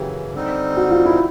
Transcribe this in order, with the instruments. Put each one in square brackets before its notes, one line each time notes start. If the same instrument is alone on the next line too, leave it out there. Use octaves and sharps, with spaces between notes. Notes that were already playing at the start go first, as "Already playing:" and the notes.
Already playing: [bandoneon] F#2 C#3 E3 [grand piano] G4
[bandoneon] D3 G3 C4 D#4
[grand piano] F#4
F4
E4